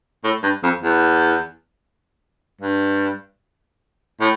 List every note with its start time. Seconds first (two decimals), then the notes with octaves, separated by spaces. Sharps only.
0.24 A2
0.43 G2
0.63 F2
0.83 E2
2.61 G2
4.21 A2